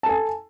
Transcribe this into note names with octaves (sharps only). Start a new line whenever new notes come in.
A4 G#5 A5